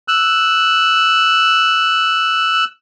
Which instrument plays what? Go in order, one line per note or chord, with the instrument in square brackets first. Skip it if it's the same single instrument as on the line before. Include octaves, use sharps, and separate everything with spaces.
[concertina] E6 F#6